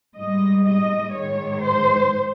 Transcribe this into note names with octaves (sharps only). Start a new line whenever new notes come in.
G#2 G3 D#5
D#5
G#2 D#3 G#3 C#5
C5